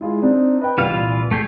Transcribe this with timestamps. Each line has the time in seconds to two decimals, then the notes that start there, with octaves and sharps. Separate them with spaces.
0.01 G#3 E4 F4 G#4
0.22 C4 D4 D#4
0.61 B4 D#5 G5
0.78 C2 E3 G3 F4 F5
0.91 A#2
1.31 A3 G4 G#4